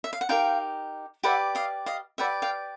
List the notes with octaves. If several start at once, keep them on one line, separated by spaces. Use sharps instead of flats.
E5
F5
F#5
D#4 G4 A#4 F5 G5
G4 B4 D5 E5 F#5
D#5 F5
D#5 F5
G4 B4 D5 E5 F#5
F5 G5